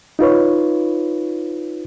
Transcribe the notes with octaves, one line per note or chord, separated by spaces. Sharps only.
D#4 F4 B4 C#5